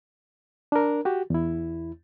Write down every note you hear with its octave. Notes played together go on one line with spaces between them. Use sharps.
D4 A#4
F#4 G4
E2 E4